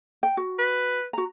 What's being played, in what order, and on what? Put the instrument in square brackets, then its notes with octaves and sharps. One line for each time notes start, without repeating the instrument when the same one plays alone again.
[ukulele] G5
F#4
[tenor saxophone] B4
[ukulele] F#4 A#5